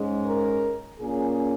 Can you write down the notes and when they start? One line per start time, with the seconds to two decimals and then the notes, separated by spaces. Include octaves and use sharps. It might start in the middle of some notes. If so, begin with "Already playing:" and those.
Already playing: G#2 G#3 C#4
0.26 A#4
1.00 A#2 A#3 C#4 G#4